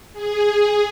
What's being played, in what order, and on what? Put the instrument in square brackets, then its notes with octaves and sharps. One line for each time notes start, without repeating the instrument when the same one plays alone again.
[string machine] G#4